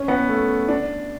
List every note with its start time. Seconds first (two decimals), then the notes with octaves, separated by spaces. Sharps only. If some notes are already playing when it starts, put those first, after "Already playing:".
Already playing: C#4
0.08 B3
0.29 A3
0.68 D4